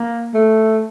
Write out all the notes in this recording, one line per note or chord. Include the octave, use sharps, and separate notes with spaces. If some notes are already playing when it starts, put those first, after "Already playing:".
Already playing: A#3
A3